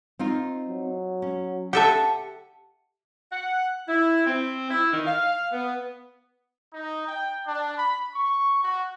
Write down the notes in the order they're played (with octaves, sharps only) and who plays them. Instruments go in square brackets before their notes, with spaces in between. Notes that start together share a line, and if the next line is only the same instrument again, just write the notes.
[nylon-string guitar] C4 D#4 F4
[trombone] F#3
[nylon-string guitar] C#4
[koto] G4 A4 E5 [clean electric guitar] F#5 A5
[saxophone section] F#5
E4
C4
E4
D#3
F5
B3
[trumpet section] D#4
G5
D4
B5
C#6
F#4